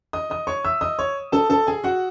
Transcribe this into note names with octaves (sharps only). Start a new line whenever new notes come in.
D#5 D#6
D#5 D#6
C#5 C#6
E5 E6
D#5 D#6
C#5 C#6
A4 A5
A4 A5
G#4 G#5
F#4 F#5